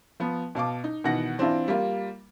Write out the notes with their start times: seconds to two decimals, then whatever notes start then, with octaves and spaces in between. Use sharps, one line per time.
0.20 F3 B3
0.55 B2 F5 A5 D6
0.84 D#4
1.04 B2 D#3 E3 D#4 F#5 A#6
1.38 E3 C4 D4 E4 F4
1.68 G3 A#3 F4